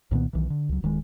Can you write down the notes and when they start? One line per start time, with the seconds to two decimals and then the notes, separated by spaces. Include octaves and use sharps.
0.11 C2 A#2 D#3 B3
0.33 B1 D#3 E3
0.50 D3
0.69 C#2 F#3
0.83 D1 D#3 F#3 G#3